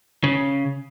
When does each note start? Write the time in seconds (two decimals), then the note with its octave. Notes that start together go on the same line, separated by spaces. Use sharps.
0.24 C#3